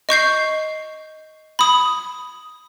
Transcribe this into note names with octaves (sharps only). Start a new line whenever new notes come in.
D#5 C#6 G6 C7
B5 D#6